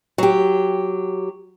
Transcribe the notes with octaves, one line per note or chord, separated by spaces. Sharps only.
F#3 G4